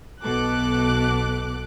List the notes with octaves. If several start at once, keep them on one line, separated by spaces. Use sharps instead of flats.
B1 B2 A4 D6 F#6